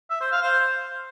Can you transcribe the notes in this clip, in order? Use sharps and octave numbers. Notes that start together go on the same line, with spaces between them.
E5
C5
F5
C5